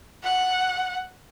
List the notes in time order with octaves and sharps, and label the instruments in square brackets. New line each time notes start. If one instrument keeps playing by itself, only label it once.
[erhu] F#5